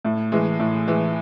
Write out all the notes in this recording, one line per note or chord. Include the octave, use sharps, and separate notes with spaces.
A2
E3 G#3
A2
E3 G#3